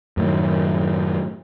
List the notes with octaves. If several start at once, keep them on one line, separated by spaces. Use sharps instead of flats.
F#2 A2 D#3